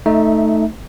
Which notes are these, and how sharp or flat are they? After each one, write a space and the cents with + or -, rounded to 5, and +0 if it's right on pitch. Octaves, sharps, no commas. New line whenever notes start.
A3 +0 D#4 +0 E5 -20